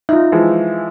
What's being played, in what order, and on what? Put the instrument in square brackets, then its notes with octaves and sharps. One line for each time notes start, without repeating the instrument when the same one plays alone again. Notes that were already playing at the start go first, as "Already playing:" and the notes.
[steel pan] D#4 F4 [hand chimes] E5
[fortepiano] E3 F3 G#3